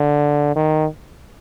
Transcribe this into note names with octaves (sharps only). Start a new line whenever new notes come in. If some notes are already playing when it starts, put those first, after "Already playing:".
Already playing: D3
D#3